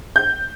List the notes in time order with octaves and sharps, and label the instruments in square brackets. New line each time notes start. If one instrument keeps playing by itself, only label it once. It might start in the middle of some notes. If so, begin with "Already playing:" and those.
[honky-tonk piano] G6